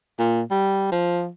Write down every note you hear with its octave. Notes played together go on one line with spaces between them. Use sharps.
A#2
G3
F3